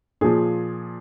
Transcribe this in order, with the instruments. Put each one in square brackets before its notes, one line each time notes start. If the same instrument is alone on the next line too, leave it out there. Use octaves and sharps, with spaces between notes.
[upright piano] A#2 F3 G#4